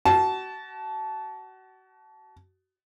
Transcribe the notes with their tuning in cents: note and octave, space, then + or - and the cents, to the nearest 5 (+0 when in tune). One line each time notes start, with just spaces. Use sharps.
F#4 +30 A5 -15